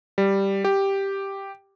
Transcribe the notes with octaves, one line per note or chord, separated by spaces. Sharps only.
G3
G4